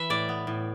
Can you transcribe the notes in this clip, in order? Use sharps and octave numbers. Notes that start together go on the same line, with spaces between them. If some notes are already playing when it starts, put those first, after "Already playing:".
Already playing: E3 B4 E5
A2 D5
B3
A2